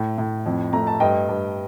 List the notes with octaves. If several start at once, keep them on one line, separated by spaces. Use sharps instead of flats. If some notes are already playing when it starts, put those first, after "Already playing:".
Already playing: A2
A2
F2
A3 A#5
A5
G2 D#5 G5
G2